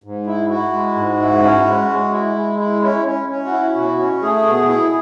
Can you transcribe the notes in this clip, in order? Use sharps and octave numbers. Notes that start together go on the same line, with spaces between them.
G#2
E4
E4 F#4
G#3
G#2
E4
C#4
G#3
G#3
E4
G#3
E4
C#4 E4
C#4
C#4
F#4
E4
B2 F#4
C#4
A3 G#4
B2
E4